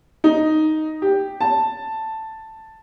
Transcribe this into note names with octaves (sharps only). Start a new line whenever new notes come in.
D#4
G4
A5